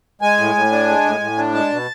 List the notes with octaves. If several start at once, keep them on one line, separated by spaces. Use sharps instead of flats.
G#3 G#5
A2
A2
D4
G#3
A2
A2
D4
G#3 A5
B2